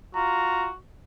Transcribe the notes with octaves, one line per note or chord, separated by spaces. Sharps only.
F4 F#4 A#5